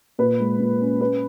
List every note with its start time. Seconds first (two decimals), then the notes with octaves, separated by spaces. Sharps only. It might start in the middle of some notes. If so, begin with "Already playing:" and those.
0.19 A#2 B4
0.40 G#3
0.59 A#2
0.81 C#4
1.01 C#4 B4